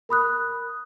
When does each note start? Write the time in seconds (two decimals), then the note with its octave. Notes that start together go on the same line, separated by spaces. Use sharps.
0.09 A#4 B5 D#6 F#6